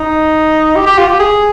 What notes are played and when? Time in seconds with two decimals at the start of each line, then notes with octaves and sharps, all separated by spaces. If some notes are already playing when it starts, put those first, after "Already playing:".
Already playing: D#4
0.76 G4
0.86 G4
0.98 F4
1.08 G4
1.19 G#4